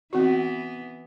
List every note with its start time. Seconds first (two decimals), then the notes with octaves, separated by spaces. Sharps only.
0.13 E3 B3 C4 F#4